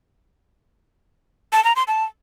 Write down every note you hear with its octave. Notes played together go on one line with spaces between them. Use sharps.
A5
A#5
C6
A5